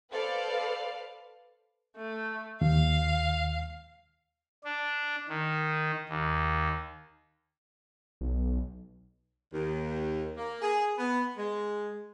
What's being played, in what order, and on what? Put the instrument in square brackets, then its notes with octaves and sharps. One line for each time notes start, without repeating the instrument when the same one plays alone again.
[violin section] A4 B4 C5 D5 F5
[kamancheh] A3
[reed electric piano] D#2 [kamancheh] F5
[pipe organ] D4
D#3
D#2
[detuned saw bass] B1
[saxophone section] D#2
A#3
G#4
B3
G#3